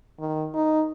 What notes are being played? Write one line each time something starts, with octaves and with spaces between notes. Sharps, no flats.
D#3
D#4